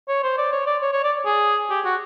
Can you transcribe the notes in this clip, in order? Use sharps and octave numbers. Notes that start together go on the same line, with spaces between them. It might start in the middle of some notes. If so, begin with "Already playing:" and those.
C#5
C5
D5
C#5
D5
C#5
C#5
D5
G#4
G4
F#4